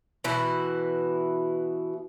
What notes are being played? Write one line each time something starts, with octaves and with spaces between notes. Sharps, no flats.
B2 E3 E4 F#4